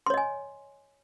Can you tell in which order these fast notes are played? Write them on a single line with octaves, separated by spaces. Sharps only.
C6 C#5 D#5 G#5